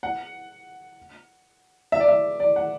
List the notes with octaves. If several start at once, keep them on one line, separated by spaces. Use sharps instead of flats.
F#5
E5
D5
E5
D5
F#5